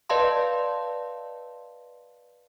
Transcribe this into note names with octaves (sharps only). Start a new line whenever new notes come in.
B4 D5 D#5 F5 A5 C6